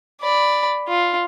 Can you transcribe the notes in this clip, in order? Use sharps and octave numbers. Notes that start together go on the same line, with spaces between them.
D5 B5
F4